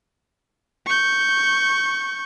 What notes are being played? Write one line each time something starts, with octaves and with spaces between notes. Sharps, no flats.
C#6 G6